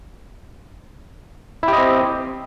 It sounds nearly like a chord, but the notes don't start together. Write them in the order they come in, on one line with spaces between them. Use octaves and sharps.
E4 G4 D#5 C4